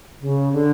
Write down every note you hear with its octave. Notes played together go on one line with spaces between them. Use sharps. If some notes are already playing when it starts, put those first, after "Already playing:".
C#3
D3